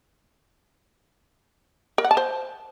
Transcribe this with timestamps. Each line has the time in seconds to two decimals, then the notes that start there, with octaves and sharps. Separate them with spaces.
1.98 A#4
2.04 F#5
2.11 A5
2.17 C5